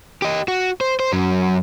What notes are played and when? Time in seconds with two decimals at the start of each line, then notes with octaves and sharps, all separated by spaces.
0.22 G4 D#5
0.48 F#4
0.81 C5
1.00 C5
1.13 F#2 F#3